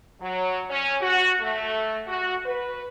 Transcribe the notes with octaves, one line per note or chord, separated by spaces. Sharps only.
F#3
C#4
F#4
A3
F#4
B4